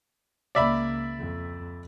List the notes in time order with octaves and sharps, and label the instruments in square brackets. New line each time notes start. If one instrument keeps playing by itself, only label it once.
[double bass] C#2 A#3 [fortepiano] D5 E5 B5
[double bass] F2